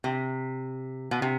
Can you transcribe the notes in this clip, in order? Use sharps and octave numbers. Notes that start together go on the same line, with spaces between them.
C3
B2
C3